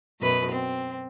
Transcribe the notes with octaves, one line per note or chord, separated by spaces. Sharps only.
F#2 B2 B4
C4